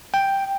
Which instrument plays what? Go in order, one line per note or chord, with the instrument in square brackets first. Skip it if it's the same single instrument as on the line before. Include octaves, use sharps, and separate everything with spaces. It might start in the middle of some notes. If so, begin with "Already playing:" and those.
[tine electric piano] G5